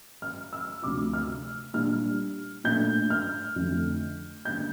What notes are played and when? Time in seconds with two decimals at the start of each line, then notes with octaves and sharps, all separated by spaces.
0.22 F6
0.53 E6
0.82 D2 C3 F3 D6
1.13 F6
1.73 A#2 G3 D4 F6
2.64 A#2 A3 D4 G6
3.10 F6
3.56 F2 D3 A3
4.45 D3 G3 A#3 G6